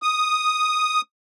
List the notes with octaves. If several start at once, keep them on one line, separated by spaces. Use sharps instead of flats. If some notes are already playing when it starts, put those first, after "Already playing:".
D#6